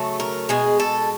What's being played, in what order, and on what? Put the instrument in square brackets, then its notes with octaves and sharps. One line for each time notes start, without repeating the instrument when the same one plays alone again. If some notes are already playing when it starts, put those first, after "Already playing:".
Already playing: [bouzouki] C#3 F#3 A3
A#4
B2 G#3 G#4
A4